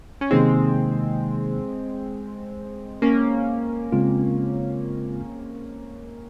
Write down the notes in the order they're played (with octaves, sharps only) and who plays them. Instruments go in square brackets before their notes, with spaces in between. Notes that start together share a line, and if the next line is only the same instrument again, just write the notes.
[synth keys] C#4
[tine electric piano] C3 D#3 A#3 D#4 [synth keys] G#3 C4
[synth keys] A#3 C#4
[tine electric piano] C#3 G#3 C4 F4